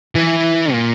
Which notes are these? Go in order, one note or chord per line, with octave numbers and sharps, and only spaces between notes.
E3
A#2